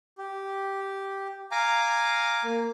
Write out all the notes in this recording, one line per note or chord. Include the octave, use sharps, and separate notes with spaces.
G4
F5 G#5 A#5 D6
A#3